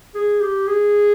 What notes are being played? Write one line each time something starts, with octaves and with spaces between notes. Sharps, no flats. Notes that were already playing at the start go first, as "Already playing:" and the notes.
G#4
G4
G#4